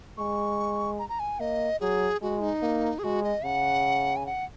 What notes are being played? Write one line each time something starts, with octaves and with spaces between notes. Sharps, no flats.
G#3 C#6
A#5
A#5
G#5
A#3 D#5
F#3 G#4
G#3 F#4
D#4
A#3
G#4
G#3 F#4
D#5
C#3 F#5
G#5
F#5